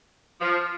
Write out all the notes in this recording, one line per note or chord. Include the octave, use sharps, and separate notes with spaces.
F3